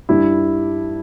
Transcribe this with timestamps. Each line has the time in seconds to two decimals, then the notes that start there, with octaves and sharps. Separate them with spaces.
0.09 G2 G3 E4